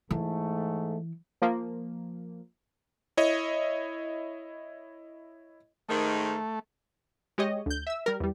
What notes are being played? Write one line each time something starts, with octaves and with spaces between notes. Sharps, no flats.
G#2 E3 A3
F3 A#3
E4 C#5 D#5
G#2 D#3 A3
G#3 G4 C#5 D#5
D2 G6
E5 E6
G3 A#4
E2 G3